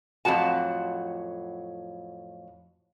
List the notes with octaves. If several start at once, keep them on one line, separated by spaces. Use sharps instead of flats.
F2 A2 F#3 F#4 A5